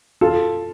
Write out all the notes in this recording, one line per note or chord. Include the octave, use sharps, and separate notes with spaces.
F4 A4